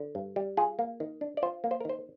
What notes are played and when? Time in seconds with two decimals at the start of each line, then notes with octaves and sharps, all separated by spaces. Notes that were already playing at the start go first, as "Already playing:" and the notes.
Already playing: D3
0.15 G2
0.36 G3
0.57 F4 G#4
0.79 A#3
1.00 D#3
1.21 D4
1.37 D5
1.43 F4 C5
1.64 A#3
1.71 C5
1.81 A#4
1.85 D#3 C5